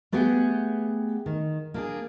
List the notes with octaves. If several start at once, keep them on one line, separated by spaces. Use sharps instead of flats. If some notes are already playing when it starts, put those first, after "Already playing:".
A3 B3 G4 G#4 F#5 G5
D#3
A#3 D4 G#4